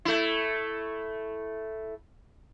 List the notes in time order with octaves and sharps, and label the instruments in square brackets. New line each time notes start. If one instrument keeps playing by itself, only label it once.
[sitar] A3 E4